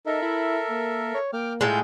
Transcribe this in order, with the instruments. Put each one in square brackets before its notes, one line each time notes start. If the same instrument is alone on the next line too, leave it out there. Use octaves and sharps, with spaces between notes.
[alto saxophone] D#4 [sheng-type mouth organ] A4 A#4 E5
[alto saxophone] E4
A#3
C#5
[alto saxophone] A#3 [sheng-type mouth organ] G5 D6 F6
[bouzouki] A2 G#3 [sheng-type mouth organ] F4 A4 G6